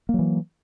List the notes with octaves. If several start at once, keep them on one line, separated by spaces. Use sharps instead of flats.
E3 F#3 A#3